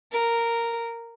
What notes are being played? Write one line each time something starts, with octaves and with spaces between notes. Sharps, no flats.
A#4